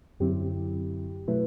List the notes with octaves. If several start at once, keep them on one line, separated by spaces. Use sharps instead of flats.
F#2 D3 F#3 C4 E4 G4
B2 F#3 A3 E4 B4